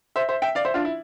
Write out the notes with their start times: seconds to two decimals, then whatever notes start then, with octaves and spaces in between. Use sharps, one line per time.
0.16 C5 E5
0.29 C5 E5
0.42 E5 G5
0.55 D5 F5
0.65 C5 E5
0.74 D4 F4
0.85 E4